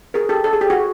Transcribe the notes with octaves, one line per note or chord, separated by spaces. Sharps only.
G#4 A#4
G4 A4
A4
G#4
G4
F#4 G#4